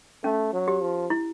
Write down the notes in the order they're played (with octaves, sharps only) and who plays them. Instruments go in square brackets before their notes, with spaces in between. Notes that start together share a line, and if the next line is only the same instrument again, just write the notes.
[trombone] A3 [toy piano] C#4
[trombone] F#3
[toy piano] G4
[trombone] F3
[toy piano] E4